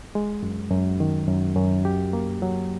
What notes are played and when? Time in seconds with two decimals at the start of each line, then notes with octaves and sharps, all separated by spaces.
0.15 G#3
0.43 F#2
0.71 F#2
1.00 D#3
1.28 F#2
1.56 F#2
1.85 G4
2.13 A#3
2.42 F#3